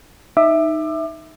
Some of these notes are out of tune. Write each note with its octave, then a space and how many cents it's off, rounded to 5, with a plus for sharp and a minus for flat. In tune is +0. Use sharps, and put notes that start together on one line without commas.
D#4 +0 E5 +0 D6 +30